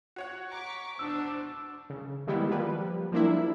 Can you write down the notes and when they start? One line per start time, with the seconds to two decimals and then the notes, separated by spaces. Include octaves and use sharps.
0.16 F#4 C#5 F#5
0.52 A#5 C#6 D6 B6
0.99 E2 B2 D4 C5 E6
1.90 C#3
2.27 D#3 E3 G3 G#3 B3 E4
2.51 F3 G3 A#3 B4
3.12 F3 G3 A#3 D4 E4